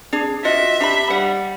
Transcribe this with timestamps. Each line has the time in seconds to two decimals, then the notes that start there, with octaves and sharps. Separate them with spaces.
0.13 D4 G#4
0.45 F4 F#4 D#5 E5
0.80 D4 G4 B5
1.10 G3 F#5